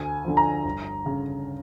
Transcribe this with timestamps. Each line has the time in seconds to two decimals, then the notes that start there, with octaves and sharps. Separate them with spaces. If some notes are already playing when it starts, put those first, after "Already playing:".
Already playing: D2 G#5
0.25 D3 F3
0.37 A#5
0.65 G1
1.06 C#3